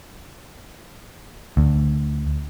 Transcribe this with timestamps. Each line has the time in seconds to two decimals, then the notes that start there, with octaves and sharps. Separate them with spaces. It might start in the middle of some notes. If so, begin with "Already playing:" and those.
1.57 D2